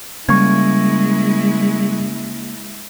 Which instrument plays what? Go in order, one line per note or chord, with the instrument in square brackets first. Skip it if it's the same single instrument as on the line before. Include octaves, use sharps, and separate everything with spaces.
[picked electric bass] C#3 A#3 [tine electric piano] G3 C#6 G#6 [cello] G#3 E4